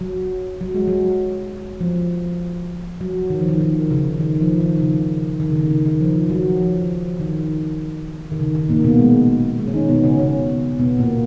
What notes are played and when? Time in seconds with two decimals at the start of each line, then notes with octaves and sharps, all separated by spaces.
0.01 F#3
0.61 F#3
0.74 G#3
0.88 F#3
1.81 F3
3.01 F#3
3.30 D#3
3.39 F3
3.49 D#3
3.60 D#3
3.91 C#3
4.20 D#3
4.40 F3
4.60 D#3
4.80 C#3
5.40 D#3
5.50 C#3
5.55 D#3
5.70 C#3
5.86 D#3
6.01 F3
6.30 F#3
6.60 F3
7.20 D#3
8.32 D#3
8.40 C#3
8.55 D#3
8.70 A#2 A#3
8.84 B2 B3
8.99 G#3
9.59 G#3
9.68 C#4
9.74 D#3 D#4
9.89 B2 B3
10.04 C#3 C#4
10.19 C#3 C#4
10.79 B2 B3
10.99 A#2 A#3